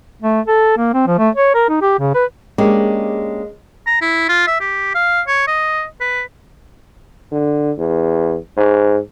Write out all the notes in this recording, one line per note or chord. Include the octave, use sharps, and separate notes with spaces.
A3
A4
A#3
C4
F3
A3
C#5
A#4
D#4
G4
C#3
B4
G#3 A#3 C#4 D4 G4
A#5
E4
F4
E5
G4
F5
C#5
D#5
B4
D3
E2
G#2